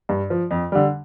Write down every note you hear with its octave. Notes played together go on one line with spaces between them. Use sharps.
G2
F3
F2
D3 G3